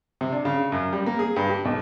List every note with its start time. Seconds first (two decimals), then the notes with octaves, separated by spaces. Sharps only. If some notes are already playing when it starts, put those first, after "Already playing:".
0.21 C3
0.32 D4
0.45 C#3
0.72 F#2
0.93 G3
1.06 A#3
1.19 G#4
1.36 G2
1.49 G4
1.65 B1